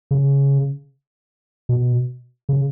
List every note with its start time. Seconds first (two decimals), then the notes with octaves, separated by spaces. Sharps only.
0.11 C#3
1.69 B2
2.49 C#3